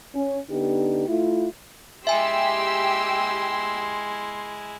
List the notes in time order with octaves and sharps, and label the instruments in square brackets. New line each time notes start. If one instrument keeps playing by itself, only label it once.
[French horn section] C#4
D3 B3 D4 D#4 G4
A3 E4 F4
[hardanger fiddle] G#3 E4 [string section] G4 E6 [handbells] E5 G#5 [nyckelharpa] C6